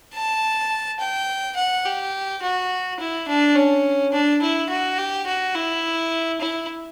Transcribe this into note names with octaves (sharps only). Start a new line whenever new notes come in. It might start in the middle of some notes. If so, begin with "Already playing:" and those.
A5
G5
F#5
G4
F#4
E4
D4
C#4
D4
E4
F#4
G4
F#4
E4
E4